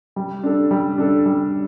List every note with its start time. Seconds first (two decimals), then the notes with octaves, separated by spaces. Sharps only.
0.16 G3
0.43 D4 A4
0.71 G3
0.98 D4 A4
1.25 G3